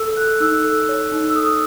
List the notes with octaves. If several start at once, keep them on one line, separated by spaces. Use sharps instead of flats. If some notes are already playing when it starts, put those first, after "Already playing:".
Already playing: A4 E6
A4 F#6
D#4 E6
A4
C#5
D#4
E6
A4 D#6